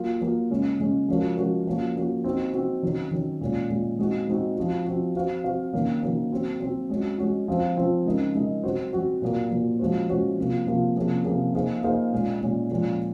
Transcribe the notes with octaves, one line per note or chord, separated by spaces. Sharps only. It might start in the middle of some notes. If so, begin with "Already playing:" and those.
Already playing: F#3 A#3 F4
F#3 A#3 F4
C#3 G#3 C#4
C#3 G#3 C#4
F3 G#3 C#4 F#4 A#4
F3 G#3 C#4 F#4 A#4
F3 A#3 C#4 F#4
F3 A#3 C#4 F#4
C4 D#4 F#4
C4 D#4 F#4
D#3 F#3 C#4
D#3 F#3 C#4
A#2 G#3 C#4
A#2 G#3 C#4
G#3 C4 D#4 F#4
G#3 C4 D#4 F#4
F3 C4 F#4
F3 C4 F#4
C4 F#4 C5 F5
C4 F#4 C5 F5
D#3 F#3 A#3 C#4
D#3 F#3 A#3 C#4
F#3 C4 F#4
F#3 C4 F#4
G#3 C#4 F#4
G#3 C#4 F#4
F3 C4 F4 C5
F3 C4 F4 C5
C#3 G#3 D#4 A#4 D#5
C#3 G#3 D#4 A#4 D#5
F#3 C4 F#4 C5
F#3 C4 F#4 C5
A#2 F#3 A#3
A#2 F#3 A#3
F3 G#3 C#4 F#4 C5
F3 G#3 C#4 F#4 C5
C3 F3 A#3 F4
C3 F3 A#3 F4
C3 F3 A#3 C#4 G#4
C3 F3 A#3 C#4 G#4
A#3 D#4 G#4 C5 F5
A#3 D#4 G#4 C5 F5
A#2 G#3 C#4
A#2 G#3 C#4
A#2 F3 G#3 C#4